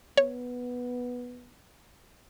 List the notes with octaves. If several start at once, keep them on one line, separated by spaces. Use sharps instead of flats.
B3 C#5